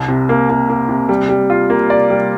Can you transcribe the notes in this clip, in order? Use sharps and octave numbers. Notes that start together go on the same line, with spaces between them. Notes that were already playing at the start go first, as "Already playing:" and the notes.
Already playing: C2
C3
A#3
A#3
A#3
C3
G3
G3
F4
A#3
D5
G3